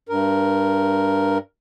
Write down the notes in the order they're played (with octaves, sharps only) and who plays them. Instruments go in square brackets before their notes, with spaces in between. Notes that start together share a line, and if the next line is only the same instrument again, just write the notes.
[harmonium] G2 A#4